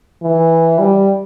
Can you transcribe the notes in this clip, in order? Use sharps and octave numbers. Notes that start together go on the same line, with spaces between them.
E3
G3